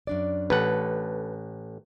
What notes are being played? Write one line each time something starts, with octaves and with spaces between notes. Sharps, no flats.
F#2 D4 D5
A1 A4 B4 F#5